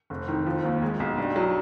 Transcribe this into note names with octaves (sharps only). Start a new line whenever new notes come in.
F1
D#3
F3
D#2
G#3
B1
G2
F#3